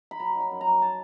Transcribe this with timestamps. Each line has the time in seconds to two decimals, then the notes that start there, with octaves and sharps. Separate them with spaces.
0.11 B5
0.20 F#3 A#5
0.35 D#3 B5
0.51 F#2
0.61 A#5
0.66 F#2
0.82 A5